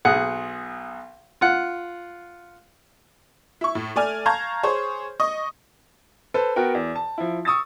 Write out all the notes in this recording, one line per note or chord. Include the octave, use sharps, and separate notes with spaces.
B1 G#4 F#5
F4 F#5
E4 C#6
A2
A3 D5 G#5 F6
F5 A5 A#5 C#6 G6 G#6
G#4 C5 C#5
D#5 C#6 D#6
A4 B4 C5
B3 F#4 A#4 G5
E2
A5
F3 E4
C#6 D#6 E6 A6